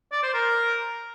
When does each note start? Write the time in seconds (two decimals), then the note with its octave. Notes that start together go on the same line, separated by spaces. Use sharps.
0.12 D5
0.23 C5
0.34 A#4